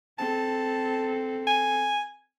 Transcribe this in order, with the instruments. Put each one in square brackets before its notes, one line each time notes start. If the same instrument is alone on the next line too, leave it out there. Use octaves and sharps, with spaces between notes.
[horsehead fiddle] C4 A4 [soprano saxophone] A5
[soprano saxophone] G#5